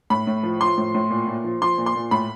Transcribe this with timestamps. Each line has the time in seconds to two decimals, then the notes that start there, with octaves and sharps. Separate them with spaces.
0.10 A2 B5
0.27 A2
0.43 F3
0.61 F3 C6
0.78 A2
0.95 A2
1.10 A#2
1.28 A#2
1.44 F3
1.62 F3 C6
1.78 A#2
1.86 C6
1.95 A#2
2.11 A2 B5